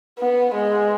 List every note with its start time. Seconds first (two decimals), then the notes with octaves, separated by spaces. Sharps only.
0.19 B3
0.54 G#3